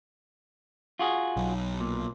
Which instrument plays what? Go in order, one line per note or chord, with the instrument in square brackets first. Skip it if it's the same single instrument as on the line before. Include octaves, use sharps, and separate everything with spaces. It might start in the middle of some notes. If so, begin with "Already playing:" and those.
[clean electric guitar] F4 F#4 G#4
[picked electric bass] B1
[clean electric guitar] A#2